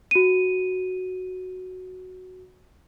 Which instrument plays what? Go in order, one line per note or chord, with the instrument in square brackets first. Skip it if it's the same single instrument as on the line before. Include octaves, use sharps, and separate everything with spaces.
[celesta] F#4 D#7